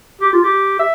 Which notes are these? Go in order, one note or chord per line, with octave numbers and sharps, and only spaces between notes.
G4
F4
G4
E5